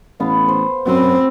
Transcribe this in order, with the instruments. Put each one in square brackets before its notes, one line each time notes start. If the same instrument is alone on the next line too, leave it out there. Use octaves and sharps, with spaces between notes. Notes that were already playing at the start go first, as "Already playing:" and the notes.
[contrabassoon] A1 [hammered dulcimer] B3 F5
[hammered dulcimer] C5
[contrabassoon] F#2 [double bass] C4 [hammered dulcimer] F#4 B4